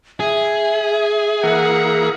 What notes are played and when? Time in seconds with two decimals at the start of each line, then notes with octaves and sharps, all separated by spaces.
0.20 G#4 E5
1.43 E3 A#3 F#5